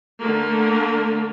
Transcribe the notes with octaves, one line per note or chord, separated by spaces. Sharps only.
D3 A3 A#3